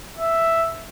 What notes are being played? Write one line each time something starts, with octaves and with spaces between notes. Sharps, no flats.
E5